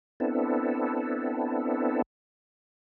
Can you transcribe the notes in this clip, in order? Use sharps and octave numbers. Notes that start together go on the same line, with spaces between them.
B3 C4 D4 E4 A4